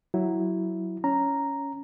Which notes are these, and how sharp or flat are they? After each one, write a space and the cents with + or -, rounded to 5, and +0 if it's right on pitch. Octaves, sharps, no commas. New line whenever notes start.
F#3 +10 E4 +0
C#4 +10 A#5 +0